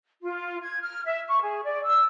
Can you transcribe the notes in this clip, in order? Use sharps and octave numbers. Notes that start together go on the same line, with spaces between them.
F4
G#6
F6
E5
C#6
G#4
D5
E6